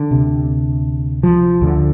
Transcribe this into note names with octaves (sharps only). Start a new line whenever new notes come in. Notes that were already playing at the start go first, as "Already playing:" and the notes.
Already playing: D3
D2 C3
F3
D2 D3